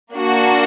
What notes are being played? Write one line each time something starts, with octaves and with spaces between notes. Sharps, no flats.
A#3 D4 F#4